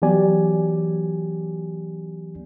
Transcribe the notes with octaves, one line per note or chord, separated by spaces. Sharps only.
E3 F#3 B3 G4 D5 G#5